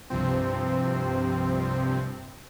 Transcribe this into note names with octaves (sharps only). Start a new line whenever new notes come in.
C2 G2 C3 F3 C4